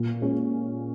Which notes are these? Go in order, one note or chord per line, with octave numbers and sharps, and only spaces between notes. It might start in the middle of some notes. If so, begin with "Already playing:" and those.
Already playing: A#2
G#3 C#4